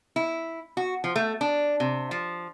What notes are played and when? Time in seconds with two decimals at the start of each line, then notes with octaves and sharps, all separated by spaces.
0.16 E4
0.77 F#4
1.04 F3
1.16 A3
1.41 D4
1.80 C3
2.11 F3